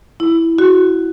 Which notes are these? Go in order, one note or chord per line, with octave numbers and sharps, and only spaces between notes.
E4
F#4